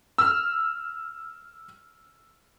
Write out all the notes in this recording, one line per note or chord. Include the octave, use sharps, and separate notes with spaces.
E6 F6